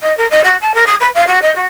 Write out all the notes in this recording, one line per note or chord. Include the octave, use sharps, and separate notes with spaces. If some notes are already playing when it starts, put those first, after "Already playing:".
D#5
A#4
D#5
F#4
A5
A#4
D#6
B4
F5
F#4
D#5
F#4